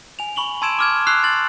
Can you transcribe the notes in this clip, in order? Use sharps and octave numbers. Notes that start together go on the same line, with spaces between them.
G#5 F7
B5 C#6 F#7 G7
A5 C6 E6 G#6 D7 E7
D6 F6 G#6
C#6 E6 F#6 C7 F7
C6 A6 F#7